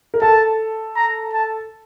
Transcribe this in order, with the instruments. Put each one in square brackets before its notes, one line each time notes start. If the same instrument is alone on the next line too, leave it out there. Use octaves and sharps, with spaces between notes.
[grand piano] A#4
[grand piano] A4 [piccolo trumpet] A5
[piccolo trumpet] A#5
A5